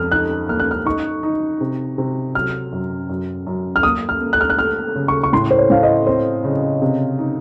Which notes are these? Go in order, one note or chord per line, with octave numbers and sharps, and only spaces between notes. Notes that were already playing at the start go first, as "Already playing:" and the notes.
Already playing: F2 D#6 F6
D#4 F#6
A#3 F6
F#6
F6
D#4 C#6
D#4
C3
C3
F#3 F6
F#2
F#2
F#2
F6
A#3 D#6
F6
A#3
F#6
F6
F#6
A3 F6
C#3
C#6
C#6
A2 C6
C5
C#5
A2 F5
D#5
C4 C5
C#3
C3
D#4